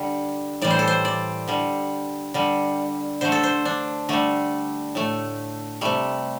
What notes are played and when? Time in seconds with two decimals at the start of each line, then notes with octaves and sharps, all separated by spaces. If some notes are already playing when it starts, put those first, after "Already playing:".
Already playing: D3 G3
0.61 A2 E3 G3 D5
0.70 C5
0.79 A4
0.88 C5
1.05 D5
1.48 D3 G3
2.34 D3 G3
3.21 D3 A3 C5
3.32 A4
3.43 C5
3.65 D4
4.09 D3 G3 A3
4.95 A2 A3
5.81 C3 G3 A3